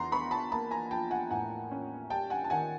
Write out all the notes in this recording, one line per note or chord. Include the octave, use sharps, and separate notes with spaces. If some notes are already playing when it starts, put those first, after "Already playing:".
Already playing: E2 A#5 C6
B3 B5 C#6
A5 B5
A#3 A5 B5
G#5 A#5
F3 G5 A5
F#5 G#5
A2 F#5 G#5
C#4
G3 G5 A5
F#5 G#5
A5
D#3 F#5 G#5